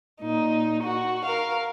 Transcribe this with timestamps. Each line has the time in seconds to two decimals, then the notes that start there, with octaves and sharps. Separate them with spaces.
0.22 A#2 D#4
0.83 F#4
1.26 A#4 F5